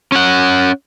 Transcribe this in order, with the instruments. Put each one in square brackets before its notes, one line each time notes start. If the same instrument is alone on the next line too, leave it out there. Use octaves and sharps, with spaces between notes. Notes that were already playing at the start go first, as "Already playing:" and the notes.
[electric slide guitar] C#4 F#5